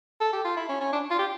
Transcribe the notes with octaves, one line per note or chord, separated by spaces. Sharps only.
A4
G4
F4
E4
C#4
C#4
D4
F4
G4